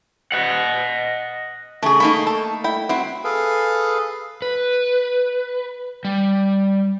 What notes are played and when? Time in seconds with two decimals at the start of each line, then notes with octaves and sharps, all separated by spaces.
0.32 D#5 F#5
1.83 C#3 A3 G#4
2.00 A3 A#3 D#4 B5
2.27 A4
2.64 E4 G5
2.89 C4 E4 F#4
3.24 G#4 A4 B4 F5
4.42 B4
6.05 G3